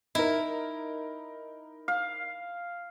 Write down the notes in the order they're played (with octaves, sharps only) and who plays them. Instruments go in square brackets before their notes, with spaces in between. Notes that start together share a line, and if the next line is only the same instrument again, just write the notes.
[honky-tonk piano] D#4 A#4 [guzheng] E4
[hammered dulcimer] F5